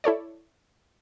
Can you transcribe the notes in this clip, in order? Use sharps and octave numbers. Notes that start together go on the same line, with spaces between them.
E4 A4 C#5 D5